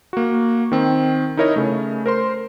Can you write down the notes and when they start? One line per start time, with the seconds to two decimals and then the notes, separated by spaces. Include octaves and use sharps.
0.13 A#3 F#4
0.72 D#3 C4
1.37 D#4 E4 A#4 C#5 D#5
1.56 C#3 A3
2.06 A#4 C5 C6